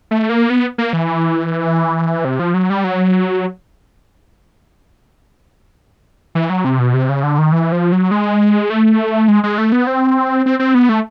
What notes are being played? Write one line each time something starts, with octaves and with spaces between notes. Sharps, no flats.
A3
A#3
B3
A#3
E3
C3
F3
F#3
G3
F#3
E3
F#3
C3
B2
C3
C#3
D3
D#3
E3
F3
F#3
G#3
A3
G#3
G#3
A3
B3
C4
C4
C4
B3
A3